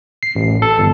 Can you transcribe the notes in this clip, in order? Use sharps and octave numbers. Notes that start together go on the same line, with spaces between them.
C7
A1
A4
G1